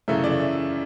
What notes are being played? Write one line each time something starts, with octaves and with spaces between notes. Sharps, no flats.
F#2 C#3 E3 A3 E5
D5
E5